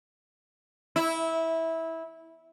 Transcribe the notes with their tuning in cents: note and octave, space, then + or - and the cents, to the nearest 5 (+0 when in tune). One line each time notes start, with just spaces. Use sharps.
E4 -15